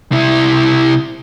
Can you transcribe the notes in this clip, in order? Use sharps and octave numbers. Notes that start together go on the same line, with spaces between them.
C3 E4